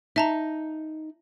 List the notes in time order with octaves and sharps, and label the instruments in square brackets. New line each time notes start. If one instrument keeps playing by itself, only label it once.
[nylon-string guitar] D#4 [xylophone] E5 A5 A#5